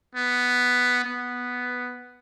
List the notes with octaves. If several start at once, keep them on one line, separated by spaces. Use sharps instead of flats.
B3
B3